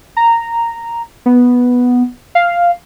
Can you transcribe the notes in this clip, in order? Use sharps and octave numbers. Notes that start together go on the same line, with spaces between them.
A#5
B3
F5